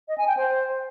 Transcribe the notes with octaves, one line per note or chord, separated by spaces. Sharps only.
D#5
G#5
G5
C5